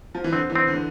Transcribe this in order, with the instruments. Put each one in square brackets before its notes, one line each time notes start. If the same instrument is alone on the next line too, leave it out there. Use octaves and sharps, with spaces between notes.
[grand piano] F3
E3
[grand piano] D3 [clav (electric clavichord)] C4
[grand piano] E3
[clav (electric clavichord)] C4
[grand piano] D3